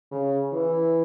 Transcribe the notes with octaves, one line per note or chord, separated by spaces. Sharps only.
C#3
E3